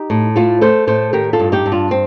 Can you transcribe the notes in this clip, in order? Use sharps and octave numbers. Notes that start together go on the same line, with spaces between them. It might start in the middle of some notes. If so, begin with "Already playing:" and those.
Already playing: D#4 G4
A2
A3 F4 A4
A3 A4 C5
A2 A4 C5
D#3 G4 A#4
F4 A4
G2
D#4 G4
G2
D4 F4
C4